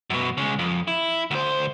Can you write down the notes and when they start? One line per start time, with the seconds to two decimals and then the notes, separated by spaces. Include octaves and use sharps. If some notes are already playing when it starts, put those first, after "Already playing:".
0.10 F#2 B2
0.37 C#3 G#3
0.59 F2
0.88 E4
1.31 D2 C5